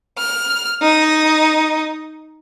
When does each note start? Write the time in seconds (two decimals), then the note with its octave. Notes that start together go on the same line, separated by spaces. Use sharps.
0.17 F6
0.82 D#4